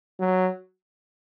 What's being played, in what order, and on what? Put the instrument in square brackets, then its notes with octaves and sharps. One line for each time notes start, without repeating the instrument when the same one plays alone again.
[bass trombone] F#3